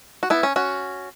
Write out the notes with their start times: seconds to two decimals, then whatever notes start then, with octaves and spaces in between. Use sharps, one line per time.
0.23 F#4
0.30 B3 E4
0.43 C#4
0.56 C#4 F#4